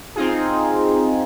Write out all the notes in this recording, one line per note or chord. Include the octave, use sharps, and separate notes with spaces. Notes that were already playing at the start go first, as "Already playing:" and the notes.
C4 D#4 F4 G#4